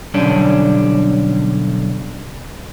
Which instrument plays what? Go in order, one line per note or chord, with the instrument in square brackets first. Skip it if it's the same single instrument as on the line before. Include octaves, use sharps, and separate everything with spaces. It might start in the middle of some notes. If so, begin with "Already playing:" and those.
[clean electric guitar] B1 D3 G3 C#4 D4